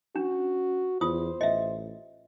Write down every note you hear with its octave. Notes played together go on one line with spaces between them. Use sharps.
C#4 D4 F#4
E2 F4 C5 D#6
A1 D#5 E5